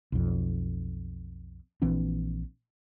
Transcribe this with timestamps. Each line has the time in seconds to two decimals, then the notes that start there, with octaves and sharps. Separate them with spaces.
0.12 B1 F2
1.82 A#1 E3 C4 D4